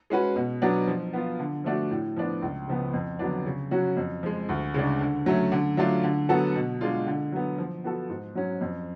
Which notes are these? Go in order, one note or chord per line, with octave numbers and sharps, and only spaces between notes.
G#3 C#4 F#4 B4
B2
F#3 B3 D4
F3
B3 F4
D3
F3 A3 D4 F#4
A2
F3 B3 D4
C#2
C#3 F3 B3
F2
D3 F#3 B3 D4
C#3
F#3 C#4 F#4
F2
F3 G#3
D2
C#3 G#3 D4
D3
F#3 A3 C#4
D3
F#3 A3 D4 F4
D3
F#3 B3 F#4 A4
B2
G#3 D4 F4
D3
F#3 B3
F3
B3 F#4 A4
G#2
F#3 C#4
F2